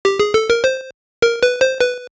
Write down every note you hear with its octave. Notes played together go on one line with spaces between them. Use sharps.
G4
G#4
A4
A#4
C5
A#4
B4
C5
B4